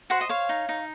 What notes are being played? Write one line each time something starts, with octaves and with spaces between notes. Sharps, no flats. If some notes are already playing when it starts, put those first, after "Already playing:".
F#4 C5 F#5
D#5
C#5 F5
D#4
D#4